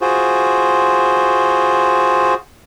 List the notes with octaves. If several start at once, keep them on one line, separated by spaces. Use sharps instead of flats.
F4 F#4 G#4 C5